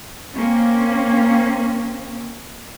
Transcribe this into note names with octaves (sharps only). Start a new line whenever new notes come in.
A#3 C4 C#4